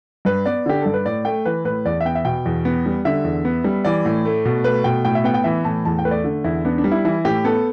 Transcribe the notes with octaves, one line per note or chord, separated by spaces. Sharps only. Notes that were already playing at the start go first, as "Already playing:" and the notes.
G2 B4
B3 D5
D3 G4
G2 A4
B4
A2 D5
A3 G5
E3 B4
A2 B4
E2 D5
E5
B3 G5
E5
B2 G5
E2
B3
G3
D3 E5
E2
B3
G3
E3 D5
A2
A3
B2
A3 B4
B2 G5
A2 G5
E5
B3 G5
G5
E3 E5
A2 A5
E2 A5
G5
A3 B4
D5
D3
E2 E4
B3 D4
D4
G3
E4
E3 E4
A2 G4
B3 A4